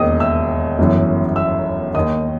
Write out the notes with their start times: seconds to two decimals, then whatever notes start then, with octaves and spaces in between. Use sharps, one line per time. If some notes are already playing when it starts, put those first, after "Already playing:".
Already playing: E1 D#2 D#3 D#5 D#6
0.19 E5 E6
0.79 G1 F#2 E3
1.36 E5 E6
1.94 D#2 D#3 D#5 D#6